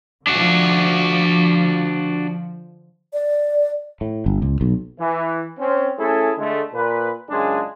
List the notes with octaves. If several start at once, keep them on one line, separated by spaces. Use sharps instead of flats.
D3 F3 D4 F#4
D5
A2
G1
C#2
B1
E3
C4 C#4
A3 C#4 E4 G#4 A4
D3 G#3 A3
A#2 B4
C#2 F#2 G#3 D4 F4 G#4